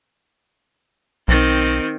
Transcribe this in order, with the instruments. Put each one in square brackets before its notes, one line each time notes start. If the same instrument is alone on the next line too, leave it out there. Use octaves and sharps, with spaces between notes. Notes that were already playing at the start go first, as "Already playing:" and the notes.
[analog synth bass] B1 [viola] D#3 C4